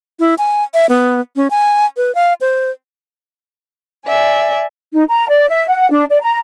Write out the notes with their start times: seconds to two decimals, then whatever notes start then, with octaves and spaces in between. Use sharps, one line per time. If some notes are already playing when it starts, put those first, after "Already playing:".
0.20 E4
0.38 G#5
0.74 E5
0.89 B3
1.36 C#4
1.51 G#5
1.97 B4
2.15 F5
2.41 C5
4.06 D5 E5 G#5
4.94 D#4
5.09 A#5
5.29 D5
5.49 E5
5.69 F#5
5.91 D4
6.10 D5
6.22 A#5